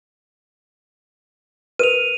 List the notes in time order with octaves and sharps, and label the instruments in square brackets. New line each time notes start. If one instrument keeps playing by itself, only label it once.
[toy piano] A#4 B4 [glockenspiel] D#7 F7